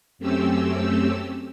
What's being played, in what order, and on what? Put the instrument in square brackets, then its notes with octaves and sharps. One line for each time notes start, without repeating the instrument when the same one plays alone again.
[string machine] F#2 A3 C4 C#4 G4 E6